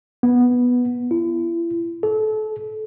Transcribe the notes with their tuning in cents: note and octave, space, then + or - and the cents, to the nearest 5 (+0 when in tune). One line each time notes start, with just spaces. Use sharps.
B3 -5
E4 +35
A4 -30